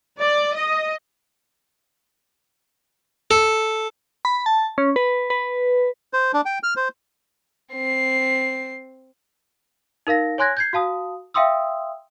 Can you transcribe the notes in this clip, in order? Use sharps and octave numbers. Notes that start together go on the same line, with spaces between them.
D5
D#5
A4
B5
A5
C#4
B4
B4
C5
D4
G5
F6
C5
C4 C7
D#4 A#4 F5 A#6
C#5 G#5 C6 F#6 G#6 A#6
G6 G#6 C7
F#4 F5 A5 D#6
E5 F5 G5 C6 D#6 E6